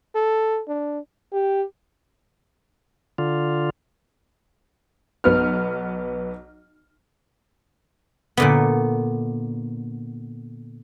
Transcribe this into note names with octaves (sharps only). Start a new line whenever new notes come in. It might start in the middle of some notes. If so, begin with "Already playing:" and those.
A4
D4
G4
D3 F4
B1 B3 F6
A#2 D3 B3